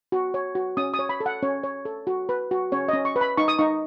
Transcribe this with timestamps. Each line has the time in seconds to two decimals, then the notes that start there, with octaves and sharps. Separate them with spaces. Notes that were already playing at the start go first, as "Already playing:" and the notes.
0.12 F#4
0.34 C#5
0.55 F#4
0.77 C#4 D#6
0.94 D#6
0.99 C#5
1.09 B5
1.20 A4
1.26 F#5
1.43 C#4 C#5
1.64 C#5
1.85 A4
2.07 F#4
2.29 B4
2.51 F#4
2.72 C#4 C#5
2.88 C#4 D#5
3.05 C#6
3.16 B4
3.21 B5
3.37 D#4 C#6
3.48 D#6
3.59 D#4 C#6